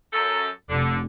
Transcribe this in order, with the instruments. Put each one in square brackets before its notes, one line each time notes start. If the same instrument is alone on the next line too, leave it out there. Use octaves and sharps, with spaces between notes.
[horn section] F#2 A4
[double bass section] F1 [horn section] D3